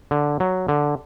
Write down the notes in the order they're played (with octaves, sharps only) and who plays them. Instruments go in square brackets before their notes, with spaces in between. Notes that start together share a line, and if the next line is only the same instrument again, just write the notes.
[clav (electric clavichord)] D3
F#3
D3